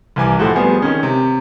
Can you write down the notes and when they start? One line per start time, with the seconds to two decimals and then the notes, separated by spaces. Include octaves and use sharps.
0.16 C2 E3 G#5 D6
0.39 A2 F3 G#3 A3 F#4
0.56 F3 G3 B3 G#4
0.82 D#3 C#4
1.03 C3